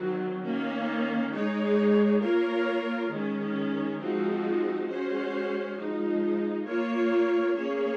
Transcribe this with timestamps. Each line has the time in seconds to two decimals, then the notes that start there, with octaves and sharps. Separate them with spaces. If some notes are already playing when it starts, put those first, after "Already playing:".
Already playing: D#3 F#3 C4 F#4
0.43 D#3 A#3 C#4
1.31 G#3 D#4 G#4 C#5
2.20 A#3 F4 A#4 C#5
3.09 D#3 G#3 C#4
3.98 F3 G#3 C4 D#4 F#4
4.88 G#3 C#4 F#4 C5
5.76 F3 G#3 D#4
6.65 A#3 F4 A#4 C#5
7.54 A#3 C#4 G#4 C#5